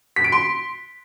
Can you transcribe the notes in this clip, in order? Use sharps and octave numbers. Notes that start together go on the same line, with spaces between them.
B6
D7
C6